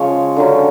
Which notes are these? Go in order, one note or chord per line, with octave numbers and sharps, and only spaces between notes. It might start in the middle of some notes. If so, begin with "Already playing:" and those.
Already playing: C#3 F3 G#3 C#5
D3 F#3 C#4